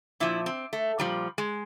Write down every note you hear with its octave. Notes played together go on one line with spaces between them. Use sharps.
A#2 F3 E4
C4
A3
A#2 F3 G3
G#3